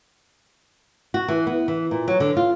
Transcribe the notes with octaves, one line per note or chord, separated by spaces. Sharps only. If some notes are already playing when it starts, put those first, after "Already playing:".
F#4
E3
B3
E3
A#2
F#3
D3
F4